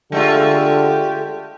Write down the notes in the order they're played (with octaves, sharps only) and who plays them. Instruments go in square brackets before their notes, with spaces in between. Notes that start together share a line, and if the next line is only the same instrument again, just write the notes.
[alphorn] D3 [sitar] G#3 A3 F4 [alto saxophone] G4